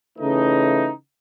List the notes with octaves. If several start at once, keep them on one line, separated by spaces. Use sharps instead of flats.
C#3 E3 A3 D#4